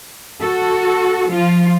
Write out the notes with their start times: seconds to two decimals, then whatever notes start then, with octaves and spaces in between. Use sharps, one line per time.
0.42 F#4 A4
1.29 F3 F4